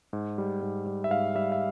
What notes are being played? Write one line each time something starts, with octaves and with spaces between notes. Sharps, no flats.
G#2
G3
G#2
G3
E5
G#2 F5
G3 E5
E5